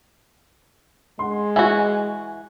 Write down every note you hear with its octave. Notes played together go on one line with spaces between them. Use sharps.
G#3 F#5 C6
E3 F#4 E5 G#5 C#6